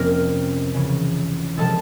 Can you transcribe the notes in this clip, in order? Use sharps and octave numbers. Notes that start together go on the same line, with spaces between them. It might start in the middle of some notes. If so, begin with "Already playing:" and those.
Already playing: F2 C3 F3 A#3 C#4 A#4 A#5
C#2 C#3 E3
C3 F3 G#3 A4 A5